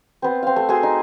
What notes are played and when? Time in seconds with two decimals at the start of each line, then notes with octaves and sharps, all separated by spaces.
0.22 B3 C4
0.43 C4 F5
0.56 A3
0.69 A3 F#4 G#4 C6
0.83 D#4